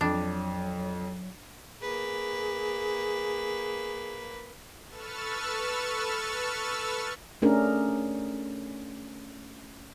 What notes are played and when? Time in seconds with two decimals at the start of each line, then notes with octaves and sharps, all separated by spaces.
0.01 F2 F#3 D4
1.82 A#3 G#4 B4
4.88 A4 B4 C#6 E6 F6 A6
7.42 A3 C#4 D4 G#4 A#4